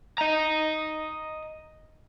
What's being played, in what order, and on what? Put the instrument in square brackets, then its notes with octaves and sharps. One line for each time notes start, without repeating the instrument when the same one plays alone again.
[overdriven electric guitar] D#5 A#5